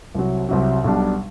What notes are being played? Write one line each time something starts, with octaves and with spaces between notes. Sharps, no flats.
C2 C3 F#3
C2 C3 F#3
B1 B2 G3 D4